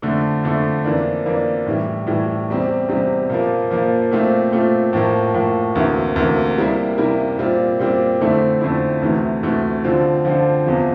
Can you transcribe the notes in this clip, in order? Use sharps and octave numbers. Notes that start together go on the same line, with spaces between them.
F2 D3 A3
F2 D3 A3
F2 E3 A#3 D4
F2 E3 A#3 D4
A2 E3 G3
A2 E3 G3
E2 C3 G3 C4
E2 C3 G3 C4
A#2 F3 A#3
A#2 F3 A#3
A#2 A3 C4 F4
A#2 A3 C4 F4
A2 F3 A#3
A2 F3 A#3
D2 C3 E3 A#3
D2 C3 E3 A#3
C3 G3 A#3 E4
C3 G3 A#3 E4
A#2 G3 C4 F4
A#2 G3 C4 F4
F2 D3 A3 C4 E4
F2 D3 A3 C4 E4
D2 C3 E3 A3
D2 C3 E3 A3
D3 F3 C4 F4
D3 F3 C4 F4
E2 C3 F3